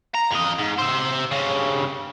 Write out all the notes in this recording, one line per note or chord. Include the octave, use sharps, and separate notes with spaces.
A#5
F2 D#5
G#2
C5 E5
G2 C#3